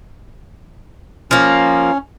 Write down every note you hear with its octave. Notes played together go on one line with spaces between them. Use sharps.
F3 A#3 C#4